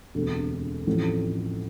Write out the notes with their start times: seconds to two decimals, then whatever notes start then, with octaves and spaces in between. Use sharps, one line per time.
0.15 E1 D2 C3
0.87 A1 A2 F3 C4